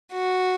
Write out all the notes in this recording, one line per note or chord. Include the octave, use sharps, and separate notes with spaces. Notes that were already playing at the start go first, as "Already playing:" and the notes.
F#4